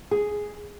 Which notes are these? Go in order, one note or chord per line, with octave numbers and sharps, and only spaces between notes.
G#4